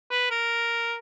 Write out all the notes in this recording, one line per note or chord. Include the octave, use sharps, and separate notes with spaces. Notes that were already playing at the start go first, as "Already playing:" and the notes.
B4
A#4